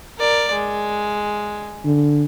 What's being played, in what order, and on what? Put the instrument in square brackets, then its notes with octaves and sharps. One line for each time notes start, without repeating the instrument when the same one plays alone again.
[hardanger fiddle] A#4 D5
G#3
[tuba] D3